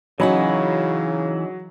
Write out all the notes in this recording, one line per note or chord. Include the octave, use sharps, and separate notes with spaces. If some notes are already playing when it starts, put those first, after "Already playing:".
C#3 E3 F#3 C#4 D#4 F#4 B5